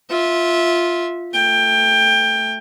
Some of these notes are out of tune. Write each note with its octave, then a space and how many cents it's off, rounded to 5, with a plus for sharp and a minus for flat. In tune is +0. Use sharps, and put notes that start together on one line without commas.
F4 +0 E5 -15
A3 +0 G5 +20